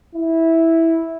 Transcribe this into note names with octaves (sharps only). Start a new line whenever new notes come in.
E4